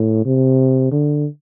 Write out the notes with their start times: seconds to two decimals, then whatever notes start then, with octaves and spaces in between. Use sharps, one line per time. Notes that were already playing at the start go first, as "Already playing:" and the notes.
Already playing: A2
0.25 C3
0.92 D3